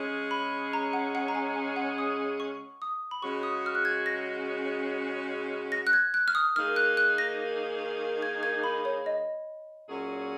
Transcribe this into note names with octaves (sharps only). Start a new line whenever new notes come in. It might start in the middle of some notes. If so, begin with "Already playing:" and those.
Already playing: C#3 G#3 C#4 G#4
B5
A#5
F#5
F#5
A#5
G#5
G#5
F#5
D#6
C#6
D#6
B5
C#3 G#3 C#4 F#4 C#6
D#6
F6
F#6
G#6
A#6
A#6
F#6
G#6
F#6
F6
D#6
D#3 A#3 D#4 G#4 F6
F#6
F#6
A#6
G#6
G#6
B5
C#5
D#5
A#2 F#3 C#4 G#4